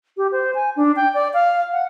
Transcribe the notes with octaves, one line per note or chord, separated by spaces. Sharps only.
G4
C5
G#5
D4
G5
D5
F5
F#5